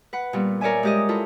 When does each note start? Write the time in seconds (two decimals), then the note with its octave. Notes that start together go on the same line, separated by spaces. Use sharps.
0.13 B4 F#5
0.33 A#2 G3 B3
0.61 A#4 C#5 D5 E5 G#5
0.83 G#3 G4 D#5
1.09 E4 F4 A4